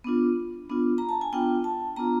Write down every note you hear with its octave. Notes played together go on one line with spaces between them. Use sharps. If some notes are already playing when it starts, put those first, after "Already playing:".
B3 D4 F4
B3 D4 F4
A#5
A5
G#5
B3 D4 F4 G5
A5
B3 D4 F4 A#5